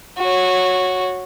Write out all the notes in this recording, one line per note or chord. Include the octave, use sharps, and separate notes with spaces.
F#4 C#5